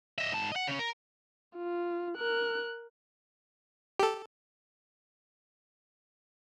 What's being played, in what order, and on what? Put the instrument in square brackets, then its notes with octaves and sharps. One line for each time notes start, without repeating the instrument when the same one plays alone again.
[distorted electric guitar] D#5 E5
G#2 A5
D#5 F#5
C#3 C#4
A#4
[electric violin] F4
A#4 F#6
[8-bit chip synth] G4 A4